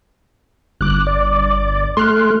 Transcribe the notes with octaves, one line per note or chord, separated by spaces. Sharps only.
G1 D6 F#6
D5
A3 C6 F6 F#6